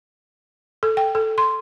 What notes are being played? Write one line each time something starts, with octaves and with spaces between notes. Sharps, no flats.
A4
G5
A4
C6